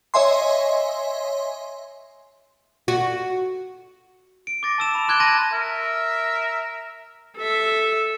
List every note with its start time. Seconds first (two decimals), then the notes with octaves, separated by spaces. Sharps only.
0.14 C#5 D#5 E5 G#5 C6
2.88 F#4
4.47 D7
4.63 D6 A6 A#6
4.78 A5 E6 E7
4.95 B5
5.08 C6 D6 F#6 G#6 D7 G7
5.20 A5 C6 A#6 D#7
5.53 A#4 E5
7.38 A4 E5